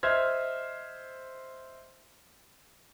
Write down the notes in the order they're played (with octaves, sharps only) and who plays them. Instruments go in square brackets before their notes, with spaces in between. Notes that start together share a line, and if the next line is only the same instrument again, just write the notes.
[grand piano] C5 D#5 E5 F6 G#6